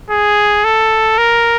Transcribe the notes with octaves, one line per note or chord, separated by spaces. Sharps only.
G#4
A4
A#4